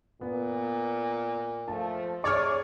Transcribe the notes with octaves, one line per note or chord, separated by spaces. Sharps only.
A#2 B3
F3 A3 A5
C3 G#4 C#5 D5 C#6 F6